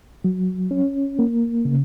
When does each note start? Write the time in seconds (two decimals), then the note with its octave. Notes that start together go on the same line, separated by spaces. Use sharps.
0.24 F#3
0.71 C#4
1.19 A#3
1.65 C#3